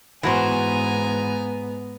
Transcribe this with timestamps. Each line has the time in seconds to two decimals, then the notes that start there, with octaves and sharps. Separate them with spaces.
0.23 G#2 E3 B3 F#4 C5 G#5 A#5